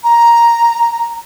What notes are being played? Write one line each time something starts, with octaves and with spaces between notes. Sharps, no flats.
A#5